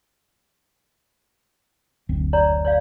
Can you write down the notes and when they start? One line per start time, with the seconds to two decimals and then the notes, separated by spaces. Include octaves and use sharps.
2.09 F#1 D2 C4
2.33 C#5 D5 A#5
2.65 C#5 D5 F5